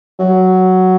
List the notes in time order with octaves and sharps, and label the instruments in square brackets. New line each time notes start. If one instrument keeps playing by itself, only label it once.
[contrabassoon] F#3